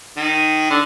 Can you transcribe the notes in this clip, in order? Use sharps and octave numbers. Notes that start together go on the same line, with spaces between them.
D#3
D3